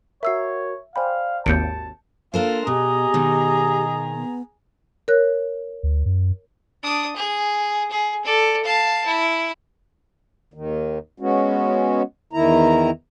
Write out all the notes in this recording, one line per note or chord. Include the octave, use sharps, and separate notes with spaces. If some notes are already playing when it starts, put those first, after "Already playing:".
F#4 A#4 C#5 E5 E6 C7
C5 D5 F5 G5 G#5 B5
G#1 D#2 A5 G6 C#7 D7
A#3 D4 F4 A4 A#4 C5
B2 G4 G#4 D#5 A#5
B2 D#3
B3
A#4 C#5 F#6
D2
F#2
D4 D#6
G#4
G#4
A4 D5
F5 A5
E4
D#2 D#3
G#3 B3 C#4 F#4
E2 D#3 E4 A#5